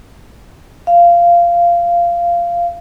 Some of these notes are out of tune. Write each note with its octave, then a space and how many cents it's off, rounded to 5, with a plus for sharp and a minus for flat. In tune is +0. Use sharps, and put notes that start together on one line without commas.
F5 -15